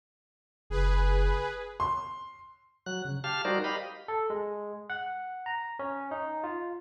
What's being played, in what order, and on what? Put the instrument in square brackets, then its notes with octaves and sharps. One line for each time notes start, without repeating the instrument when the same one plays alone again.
[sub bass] F#1 [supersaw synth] G#4 B4
[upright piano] C6
[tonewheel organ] F#3 F#6
C#3
G4 F5 A5 F6
G3 D#4 F#4 A#4 C5 D5
G4 D#5 F5 B5
[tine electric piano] A4
G#3
F#5
A#5
C#4
D#4
F4